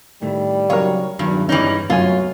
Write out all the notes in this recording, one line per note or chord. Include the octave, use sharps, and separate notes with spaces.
A2 D#3 G3 A3
C#3 F#3 D#4 A#4 C#5 F5
E2 G2 D#3 F#3
G2 E3 G3 B3 C#4 D#4
C2 F#2 F#3 A3 B3 F4 G#5